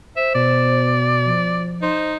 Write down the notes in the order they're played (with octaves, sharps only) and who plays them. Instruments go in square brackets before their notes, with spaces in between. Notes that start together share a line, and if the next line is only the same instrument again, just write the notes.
[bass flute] C5 [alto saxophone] E5
[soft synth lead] B2 [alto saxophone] D5
[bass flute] F3
[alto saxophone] D#4 [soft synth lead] C5